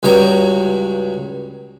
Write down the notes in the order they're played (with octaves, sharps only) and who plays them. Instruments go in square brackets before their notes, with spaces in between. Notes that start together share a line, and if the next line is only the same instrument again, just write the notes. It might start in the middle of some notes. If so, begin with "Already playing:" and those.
[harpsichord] C#2 G2 F#3 G3 C#5 A#5